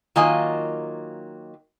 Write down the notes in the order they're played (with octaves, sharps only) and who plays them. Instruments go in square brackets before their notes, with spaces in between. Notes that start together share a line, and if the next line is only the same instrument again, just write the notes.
[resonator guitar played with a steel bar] D#3 F#3 A#3 F4 D#5 G#5